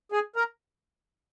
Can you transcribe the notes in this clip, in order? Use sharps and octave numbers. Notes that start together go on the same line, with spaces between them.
G#4 G#5
A#4 A#5